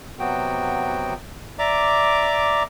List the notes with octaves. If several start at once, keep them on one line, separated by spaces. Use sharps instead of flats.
C3 F#3 B3 F#4 G5
D5 E5 A#5 D6